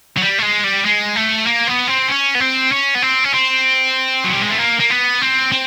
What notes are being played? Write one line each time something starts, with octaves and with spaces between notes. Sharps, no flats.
F#3
G3
A3
G#3
G3
G#3
A3
A#3
B3
C4
C#4
B3
C4
C#4
B3
C4
C#4
C4
F#3
G3
G#3
A3
A#3
A#3
B3
C4
C4